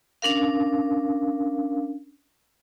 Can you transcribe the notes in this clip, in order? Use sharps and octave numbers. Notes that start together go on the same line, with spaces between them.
C#4 D4 A#4 F5